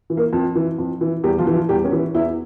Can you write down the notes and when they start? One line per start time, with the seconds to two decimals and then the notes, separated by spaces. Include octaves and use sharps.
0.10 E3
0.17 A#3 A#4
0.33 F2
0.55 E3
0.78 F2
1.01 E3
1.24 E2 G3 G4
1.39 F3 F4
1.47 E3
1.54 F3 F4
1.69 E2 G3 G4
1.84 C#4
1.92 E3
2.15 E2 E4